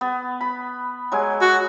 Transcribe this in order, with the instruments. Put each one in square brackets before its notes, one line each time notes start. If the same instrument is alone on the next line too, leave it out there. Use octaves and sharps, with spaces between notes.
[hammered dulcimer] B3
B5
F#3 G#3 G#5
[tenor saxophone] F#4